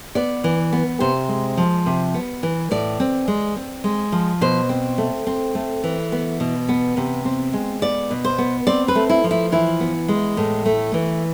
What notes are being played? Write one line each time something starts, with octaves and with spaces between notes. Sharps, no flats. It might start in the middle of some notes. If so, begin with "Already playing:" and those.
B3 D5
E3
B3
C3 C5
G#3
F3
C3
B3
E3
A2 D5
C4
G#3
C4
G#3
F3
B2 C5
C4
A3
C4
A3
E3
B3
B2
B3
C3
C4
G#3
B3 D5
B2
C5
B3
C4 D5
B4
A3
E4
F3
E4
E3 E4
B3
G#3
A2
A3
E3